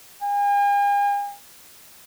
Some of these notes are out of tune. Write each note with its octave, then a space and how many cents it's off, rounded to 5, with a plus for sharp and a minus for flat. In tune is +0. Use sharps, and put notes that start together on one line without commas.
G#5 -45